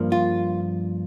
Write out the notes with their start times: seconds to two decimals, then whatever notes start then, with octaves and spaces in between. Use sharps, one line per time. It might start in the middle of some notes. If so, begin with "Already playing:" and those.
Already playing: G2 F3 A#3
0.12 F4